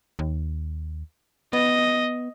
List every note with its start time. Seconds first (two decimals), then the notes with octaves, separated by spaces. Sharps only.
0.19 D#2
1.53 B3 D#5